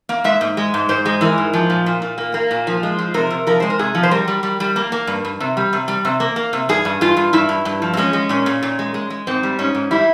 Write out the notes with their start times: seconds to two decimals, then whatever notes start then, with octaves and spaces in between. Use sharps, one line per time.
0.09 A#3
0.24 G#3 E5
0.41 G#2
0.57 G#3
0.74 G#2
0.89 G#2 C5
1.06 G#3
1.21 E3 A#4
1.38 G#2
1.53 F3
1.70 A#2
1.86 A#2
2.02 A#2
2.18 A#3
2.34 A#3
2.51 A#2
2.67 F3
2.83 G#3
2.99 F3
3.14 C3 A#4
3.30 C3
3.47 F3 A#4
3.60 G#3 C5
3.70 A#4
3.79 C3 G#4
3.95 F3
4.03 C5
4.11 G3 A#4
4.28 G3
4.43 G3
4.60 G3
4.76 A#3
4.92 A#3
5.07 G2
5.25 G2
5.40 C3
5.57 G3
5.73 C3
5.88 G3
6.05 C3
6.20 A#3
6.36 A#3
6.53 C3
6.69 G2 G#4
6.85 G2
7.01 G2 F4
7.17 G2
7.33 G2 E4
7.49 G2
7.65 G2
7.82 F3
7.93 C4
7.97 G#3 C#4
8.13 G#3
8.29 A#2 C#4
8.46 A#2
8.63 A#2
8.79 G#3
8.94 G#3
9.10 G#3
9.27 G#2 C4
9.43 G3
9.59 G#2 C#4
9.75 G#2
9.91 G3 E4